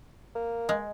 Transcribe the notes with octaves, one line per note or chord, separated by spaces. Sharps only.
A#3
G#3